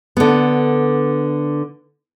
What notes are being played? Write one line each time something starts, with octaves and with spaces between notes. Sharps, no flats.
D3 B3